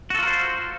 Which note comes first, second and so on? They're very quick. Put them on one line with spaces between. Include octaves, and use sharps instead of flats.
F#4 A4 F4 A#4 C5